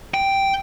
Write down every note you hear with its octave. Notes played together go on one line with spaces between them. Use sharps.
G5